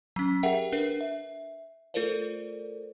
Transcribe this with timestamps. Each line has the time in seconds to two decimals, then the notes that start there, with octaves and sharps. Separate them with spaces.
0.16 F#3 C#4
0.43 G4 G#4 A#4 E5 F#5 G5
0.72 D4 A#4 B4
1.01 E5
1.94 A3 F4 A4 A#4 C5 D5